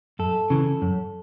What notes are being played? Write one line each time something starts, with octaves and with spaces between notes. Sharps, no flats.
F#2 A4
C#3 E3
F#2